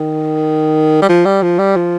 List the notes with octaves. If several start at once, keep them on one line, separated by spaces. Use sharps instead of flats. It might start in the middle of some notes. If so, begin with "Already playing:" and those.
Already playing: D#3
G3
F3
G3
F3
G3
F3